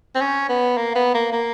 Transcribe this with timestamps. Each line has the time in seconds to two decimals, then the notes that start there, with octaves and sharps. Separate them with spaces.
0.15 C4
0.21 C#4
0.49 B3
0.77 A#3
0.95 B3
1.14 A#3
1.32 A#3